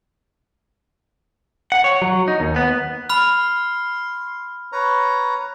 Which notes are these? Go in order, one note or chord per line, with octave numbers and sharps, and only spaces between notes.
F#5
C#5
F#3
D#4
D#2
B3
B5 C6 F6
B4 C#5 A#5